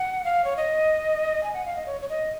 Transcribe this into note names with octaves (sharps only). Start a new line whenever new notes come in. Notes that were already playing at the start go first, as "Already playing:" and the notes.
Already playing: F#5
F5
C#5
D#5
G#5
F#5
F5
D#5
C#5
C#5
D#5